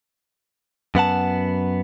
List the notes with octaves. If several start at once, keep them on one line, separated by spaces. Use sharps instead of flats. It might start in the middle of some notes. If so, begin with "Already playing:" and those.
F#2 B3 F#5 A5